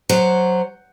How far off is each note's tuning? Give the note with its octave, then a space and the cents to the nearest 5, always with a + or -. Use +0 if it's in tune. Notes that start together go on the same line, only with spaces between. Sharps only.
F#3 +0 C5 +0 F#5 +0